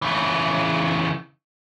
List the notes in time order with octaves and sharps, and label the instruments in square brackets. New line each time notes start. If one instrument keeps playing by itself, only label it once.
[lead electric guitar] C#3 E3